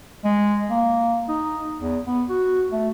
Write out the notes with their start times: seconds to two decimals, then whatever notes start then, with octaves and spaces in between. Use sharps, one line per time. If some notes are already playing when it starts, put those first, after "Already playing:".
0.24 G#3
0.70 A#3
1.28 D#4
1.79 E2
2.06 B3
2.29 F#4
2.71 A3